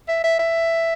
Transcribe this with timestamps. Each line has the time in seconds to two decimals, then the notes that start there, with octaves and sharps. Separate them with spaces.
0.08 E5
0.24 E5
0.39 E5